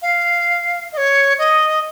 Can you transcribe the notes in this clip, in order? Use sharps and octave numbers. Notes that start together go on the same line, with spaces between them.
F5
D#5
C#5
D#5